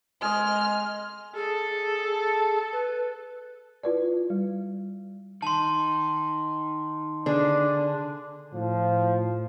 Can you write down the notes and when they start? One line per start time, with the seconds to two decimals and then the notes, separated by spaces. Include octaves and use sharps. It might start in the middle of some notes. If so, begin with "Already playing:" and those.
0.22 G#3 D#5 F6
1.36 G#4 A4
2.73 B4
3.84 E4 F4 B4 D5
4.30 G3
5.42 D#3 A5 C6
7.26 D3 D4 G#4
8.54 A2 F3